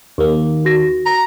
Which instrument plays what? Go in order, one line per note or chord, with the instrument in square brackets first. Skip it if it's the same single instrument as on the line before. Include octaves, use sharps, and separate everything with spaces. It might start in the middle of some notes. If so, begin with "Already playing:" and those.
[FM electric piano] D#2 A#3
[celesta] F#4 A#6
[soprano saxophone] A#5